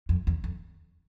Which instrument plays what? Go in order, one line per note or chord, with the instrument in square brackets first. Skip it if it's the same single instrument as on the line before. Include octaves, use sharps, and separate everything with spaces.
[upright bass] F2
E2
F2